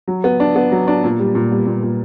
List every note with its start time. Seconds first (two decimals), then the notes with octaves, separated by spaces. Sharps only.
0.08 F#3
0.24 B3
0.40 D4
0.56 B3
0.72 F#3
0.88 D4
1.04 A#2
1.19 G3
1.35 A#2
1.52 G3
1.67 A#2
1.83 A#2